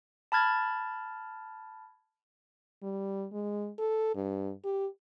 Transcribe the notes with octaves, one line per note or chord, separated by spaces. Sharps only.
A5 B5 F6 G#6 A6
G3
G#3
A4
G2
G4